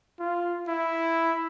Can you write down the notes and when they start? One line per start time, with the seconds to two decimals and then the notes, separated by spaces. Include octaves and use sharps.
0.19 F4
0.68 E4